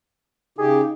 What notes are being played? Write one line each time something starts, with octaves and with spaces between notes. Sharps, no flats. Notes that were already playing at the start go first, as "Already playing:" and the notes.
C#3 D#4 G4 G#4